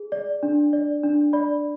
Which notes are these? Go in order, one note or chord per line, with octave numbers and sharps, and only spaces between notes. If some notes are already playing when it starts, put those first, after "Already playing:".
Already playing: G#4
D5
D4
D5
D4
D5 B5